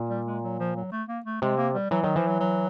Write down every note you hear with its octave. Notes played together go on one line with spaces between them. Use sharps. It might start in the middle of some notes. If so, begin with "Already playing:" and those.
Already playing: A#2
G3
G#3
F#3
F3
F#3
A3
A#3
A3
C3 G#3
A#3
G3
E3 F#3
D#3 F#3
E3 F3
F#3
F#3